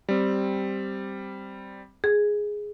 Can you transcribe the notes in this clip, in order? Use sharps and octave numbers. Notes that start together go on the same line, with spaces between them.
G3 C4
G#4